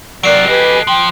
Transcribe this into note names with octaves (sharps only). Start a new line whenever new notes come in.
C3 F#3 A#4 D5 F#6 C7 D7
G4 A4 B4 D#5 G#5
F3 G5